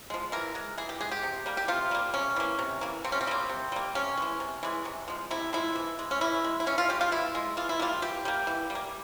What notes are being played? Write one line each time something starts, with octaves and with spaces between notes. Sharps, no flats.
F3 G#3
E3 A#4
G#3
E3 G#4
G4
G#3 G#4
G4
C3
G3 A#3
G4
C3 F4
G3 A#3
C3 C#4
E3 A#3
C3
E3 A#3
C3 C4
C#4
C4
G3 A#3
C3
G3 A#3
C3 C#4
E3 G#3
C3
E3 G#3
C3
F3 G#3
C3 E4
F3 G#3 E4
E3
G#3
C#4
E3 E4
G#3
E4
E3 C#4
F4
G#3 G4
F4
E3 E4
G#3
E3 F4
E4
G3 A#3 F4
E3 G4
G3 A#3
E3
G3
A#3